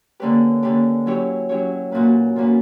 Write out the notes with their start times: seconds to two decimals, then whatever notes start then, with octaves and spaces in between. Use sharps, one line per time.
0.20 D3 A#3 C#4 G4 B4
0.63 D3 A#3 C#4 G4 B4
1.06 F#3 C#4 E4 G4 C#5
1.49 F#3 C#4 E4 G4 C#5
1.91 A#2 A#3 C#4 F#4 B4
2.36 A#2 A#3 C#4 F#4 B4